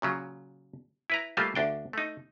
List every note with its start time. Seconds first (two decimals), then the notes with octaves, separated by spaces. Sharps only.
0.02 A#2 C#3 F#3
1.10 E4 B4 A#5
1.37 G3 A3 A#3 F4 C5
1.55 D2 D4 G5
1.93 A3 D#4